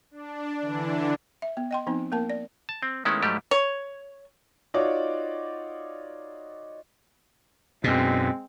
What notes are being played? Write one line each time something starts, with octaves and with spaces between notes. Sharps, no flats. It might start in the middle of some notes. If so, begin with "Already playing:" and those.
D4
D3 E3 D4
E5
B3
D#5 G5 C6
F3 B3 C4 D#4
A#3 B3 A#4 A5
D5
A5
C4
D#3 G#3 A3 B3 C#4 E4
G#2 F#3 G3 A3 G4
C#5
D#4 F4 F#4 C#5 D5
F#2 B2 G#3 C4